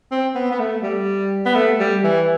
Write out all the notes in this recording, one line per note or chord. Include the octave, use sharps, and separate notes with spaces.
C4
B3
B3
A3
G3
B3
A3
G3
E3